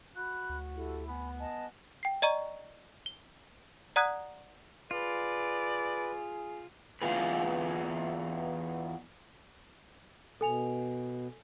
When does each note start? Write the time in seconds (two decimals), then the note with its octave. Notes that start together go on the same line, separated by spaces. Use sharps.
0.16 F#4 B5 F#6
0.50 D2
0.76 E4 G4 A4
1.07 B3 G#5 B5
1.39 D#5 G#5 A5
2.03 G5 C7
2.22 D5 D#5 A#5 C#6
3.06 G7
3.96 D5 F#5 A#5 D#6 F#6 G#6
4.91 F4 G#4 B4 D5
7.02 E2 C#3 F4 G#4 B4
10.41 B2 A4 G#5 F7